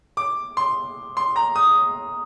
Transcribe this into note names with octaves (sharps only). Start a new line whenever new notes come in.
D6
C6
C6
A#5
D#6